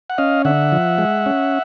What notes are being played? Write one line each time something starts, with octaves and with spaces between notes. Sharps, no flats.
F#5
C#4 D#5 F5
D3 E5 F#5
F3
G#3
C#4